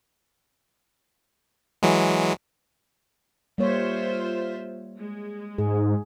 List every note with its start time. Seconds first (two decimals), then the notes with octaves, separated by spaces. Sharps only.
1.83 E3 F#3 G#3
3.58 G3 A#3 F4 C5 C#5 E5
4.96 G#3
5.58 G#2 G#4